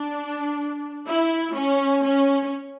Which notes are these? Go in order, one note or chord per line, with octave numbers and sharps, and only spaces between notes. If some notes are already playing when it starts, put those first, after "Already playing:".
Already playing: D4
E4
C#4
C#4